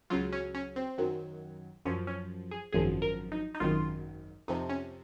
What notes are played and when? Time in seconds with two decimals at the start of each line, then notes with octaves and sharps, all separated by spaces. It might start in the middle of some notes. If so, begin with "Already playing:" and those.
0.10 C#2 C#3 F#3 F4
0.32 C#4
0.54 C#4
0.76 C4
0.98 F#2 D#3 F#3
1.85 F#2 F3 C#4
2.07 C#4
2.51 G#4
2.72 G#1 F#2 F3 G#4
3.02 A#4
3.32 D#4
3.54 D#4
3.60 G#1 F#2 D#3 F4
4.48 F2 C3 F3 D#4
4.69 C#4